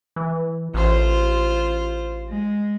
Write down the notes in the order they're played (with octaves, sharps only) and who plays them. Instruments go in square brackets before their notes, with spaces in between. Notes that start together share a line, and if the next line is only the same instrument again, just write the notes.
[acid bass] E3
[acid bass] A1 [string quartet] F4 C5
[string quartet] G#3